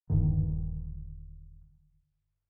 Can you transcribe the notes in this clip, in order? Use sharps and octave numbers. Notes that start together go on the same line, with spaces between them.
D#1 G2 D3 D#3